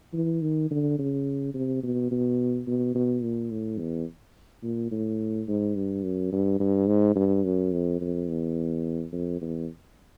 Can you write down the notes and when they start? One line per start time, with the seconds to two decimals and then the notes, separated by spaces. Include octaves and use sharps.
0.14 E3
0.42 D#3
0.71 D3
0.98 C#3
1.54 C3
1.83 B2
2.11 B2
2.67 B2
2.95 B2
3.22 A#2
3.51 A2
3.79 E2
4.63 A#2
4.91 A2
5.48 G#2
5.76 G2
6.03 F#2
6.32 G2
6.60 G2
6.87 G#2
7.16 G2
7.44 F#2
7.72 F2
8.01 F2
8.29 E2
9.13 F2
9.41 E2